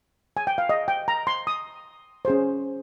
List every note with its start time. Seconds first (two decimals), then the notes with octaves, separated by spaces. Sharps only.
0.37 G#5
0.47 G5
0.58 F5
0.69 D#5
0.88 G5
1.08 A#5
1.27 C6
1.47 D#6
2.25 C#4 G#4 C5